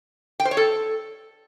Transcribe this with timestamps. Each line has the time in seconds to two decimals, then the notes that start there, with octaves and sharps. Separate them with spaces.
0.40 G5
0.45 C5
0.51 C#5
0.57 A4